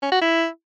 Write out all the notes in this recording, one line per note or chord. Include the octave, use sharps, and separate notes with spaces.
C#4
F#4
E4